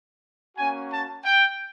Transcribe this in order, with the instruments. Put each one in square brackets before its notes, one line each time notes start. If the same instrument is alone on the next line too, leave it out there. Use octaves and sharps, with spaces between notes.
[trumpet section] A#3 C#4 F#4 G#5
A5
G5